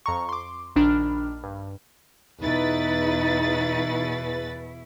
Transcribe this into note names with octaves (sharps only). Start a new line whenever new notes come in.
F2 A#5 C#6
C6 D6
A#1 D#3 D4 B5 F6
G2
E2 B2 D#4 E4 B4 A6